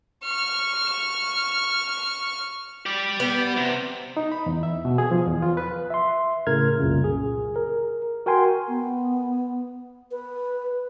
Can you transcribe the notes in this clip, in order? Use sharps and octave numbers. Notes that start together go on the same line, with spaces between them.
C#6 F6
G4 D5
B3
C3
D#4
B5
E2
E5
B2
G#4
F3
E2
F4
B4
E5 C6
A2 C#3 A#4 F6 G#6
C2 F#2 A#2 C#3
G#4
A#4
F#4 A#4 G5 G#5 C6
B3
B4